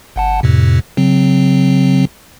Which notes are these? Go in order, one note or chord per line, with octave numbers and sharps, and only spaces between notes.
G1 F#5 A5
F2 A2 C3
C#3 F#3 C4